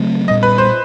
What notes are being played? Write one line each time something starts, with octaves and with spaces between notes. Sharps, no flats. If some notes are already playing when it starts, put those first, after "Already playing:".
Already playing: C#3 F#3 A3 C4
A#2 G3 B3 D#5
B4
C5